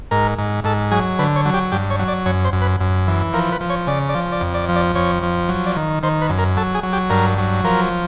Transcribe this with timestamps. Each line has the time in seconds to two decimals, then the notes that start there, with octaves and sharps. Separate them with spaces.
0.11 G#2 A#4
0.38 G#2
0.64 G#2 A4
0.91 F#3 G#4
1.19 D3 B4
1.36 C#5
1.45 F#3
1.54 G4
1.72 G2 G4
1.90 C#5
1.99 F#3
2.08 D5
2.26 F#2 C#5
2.45 C5
2.53 F#2
2.61 B4
2.80 F#2
3.08 E3
3.33 F3 A#4
3.52 B4
3.61 F3
3.70 C#5
3.87 C#3 D5
4.09 D5
4.15 F3
4.32 D5
4.41 F2
4.54 D5
4.69 F3
4.76 D5
4.95 F2 C#5
5.23 F3
5.49 F#3
5.66 D5
5.76 D#3
6.03 D#3 C5
6.21 B4
6.29 F#2
6.38 A#4
6.57 F#3 A4
6.75 G#4
6.83 F#3
6.93 G4
7.10 G2 A#4
7.38 F#3
7.64 F3 A#4